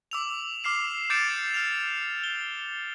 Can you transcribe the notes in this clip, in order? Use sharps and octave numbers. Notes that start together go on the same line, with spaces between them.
D6 E6 F7
D6 F6 C7 E7
D6 G6 A6 C#7 D7 E7
F6 F7
G7